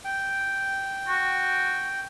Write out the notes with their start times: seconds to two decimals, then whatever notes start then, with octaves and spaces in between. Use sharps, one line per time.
0.05 G5
1.08 F#4